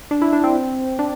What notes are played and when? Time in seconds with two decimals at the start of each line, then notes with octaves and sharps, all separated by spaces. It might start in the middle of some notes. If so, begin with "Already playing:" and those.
0.11 D4
0.22 E4
0.33 D4
0.44 C4
0.99 D4